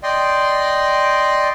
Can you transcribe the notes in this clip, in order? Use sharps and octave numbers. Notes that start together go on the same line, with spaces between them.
D5 D#5 G5 C6